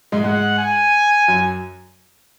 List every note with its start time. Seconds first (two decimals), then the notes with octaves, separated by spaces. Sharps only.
0.12 G#2 G#3
0.24 G#2 G#3 F#5
0.58 G#5
1.28 F#2 F#3